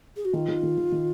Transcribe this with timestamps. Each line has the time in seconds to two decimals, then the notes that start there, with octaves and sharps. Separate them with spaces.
0.16 G#4
0.25 F#4
0.33 D#3 F4
0.48 D#3
0.63 D#3
0.78 D#3
0.92 D#3